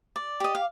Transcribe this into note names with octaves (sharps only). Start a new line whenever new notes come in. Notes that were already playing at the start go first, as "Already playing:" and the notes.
D5
G4 D#5
F5